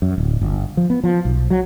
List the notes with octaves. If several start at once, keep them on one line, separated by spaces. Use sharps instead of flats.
F#2
D1
G1
F3
B3
F3
B1
F#3